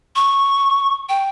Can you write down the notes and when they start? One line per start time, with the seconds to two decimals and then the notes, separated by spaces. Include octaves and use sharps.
0.16 C#6
1.09 G5